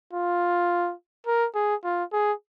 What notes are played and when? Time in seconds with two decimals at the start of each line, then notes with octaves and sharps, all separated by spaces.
0.13 F4
1.27 A#4
1.55 G#4
1.84 F4
2.13 G#4